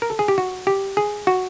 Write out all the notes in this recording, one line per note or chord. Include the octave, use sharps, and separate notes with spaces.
A#4
A4
G#4
G4
F#4
G4
G#4
F#4